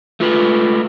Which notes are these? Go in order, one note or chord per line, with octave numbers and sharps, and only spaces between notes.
A3 F4 B4